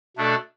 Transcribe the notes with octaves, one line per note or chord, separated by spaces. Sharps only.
B2 A3 D4 A4 D5